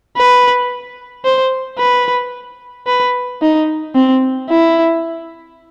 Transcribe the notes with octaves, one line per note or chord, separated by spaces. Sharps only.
B4
C5
B4
B4
D#4
C4
E4